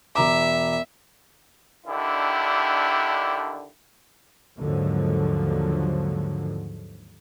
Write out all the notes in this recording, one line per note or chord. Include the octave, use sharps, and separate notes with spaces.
E1 E5 A#5 D6
D3 D#3 D4 E4 G4
D#2 G#2 D3 F3 F#3